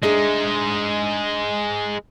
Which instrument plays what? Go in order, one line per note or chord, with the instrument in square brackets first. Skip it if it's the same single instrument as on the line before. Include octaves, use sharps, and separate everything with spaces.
[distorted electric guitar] G#3 D#4 [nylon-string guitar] D4 G#4 E5